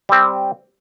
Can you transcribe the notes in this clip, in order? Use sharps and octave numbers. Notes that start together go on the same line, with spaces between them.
G3 C4